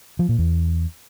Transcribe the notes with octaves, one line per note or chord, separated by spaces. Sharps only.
F3
A#2
E2